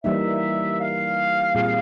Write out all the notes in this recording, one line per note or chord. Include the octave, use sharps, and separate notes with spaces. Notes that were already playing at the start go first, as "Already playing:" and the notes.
E3 G3 A#3 D#4 E5
F5
A#2 G3 C4 F4 G#4